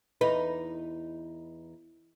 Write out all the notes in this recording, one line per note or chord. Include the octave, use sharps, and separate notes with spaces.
E2 D#4 B4